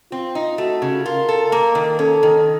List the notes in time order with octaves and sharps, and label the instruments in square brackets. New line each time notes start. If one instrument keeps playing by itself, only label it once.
[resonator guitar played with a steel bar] C4 [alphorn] F4
[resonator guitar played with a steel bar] D#4
[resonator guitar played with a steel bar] A3 [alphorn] F#4
[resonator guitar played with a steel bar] C#3
[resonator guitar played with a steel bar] F4 [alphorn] A#4
[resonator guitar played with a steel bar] A4
A#3
D#3
[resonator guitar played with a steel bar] C#4 [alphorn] A4
[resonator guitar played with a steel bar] D#3